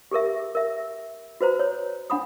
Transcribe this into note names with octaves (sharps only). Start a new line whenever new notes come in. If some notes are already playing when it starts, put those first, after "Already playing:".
G4 G#4 A#4 E5
A#4 E5
F#4 B4 C5 A#5
C#5
D4 F#5 B5 D#6